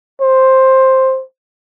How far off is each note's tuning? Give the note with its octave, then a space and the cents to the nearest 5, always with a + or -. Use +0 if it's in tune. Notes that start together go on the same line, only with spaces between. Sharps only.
C5 +10